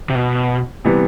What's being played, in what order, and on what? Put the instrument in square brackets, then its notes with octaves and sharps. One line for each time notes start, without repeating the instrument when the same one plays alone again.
[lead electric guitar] C3
B2
[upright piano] C3 E3 G3 B3